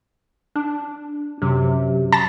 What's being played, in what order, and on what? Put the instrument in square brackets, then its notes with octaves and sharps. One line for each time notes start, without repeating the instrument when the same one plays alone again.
[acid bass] D4
[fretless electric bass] F#2 [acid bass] C3
[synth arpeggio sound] A5 B5 A6